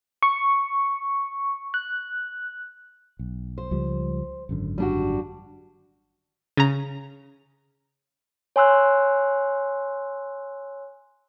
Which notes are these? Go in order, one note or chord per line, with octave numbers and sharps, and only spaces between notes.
C#6
F#6
B1
C5
C#2 F3 G3
G#1 F#2 D3
G3 D4 F#4
C#3 A#5
C#5 G#5 C6 E6 F#6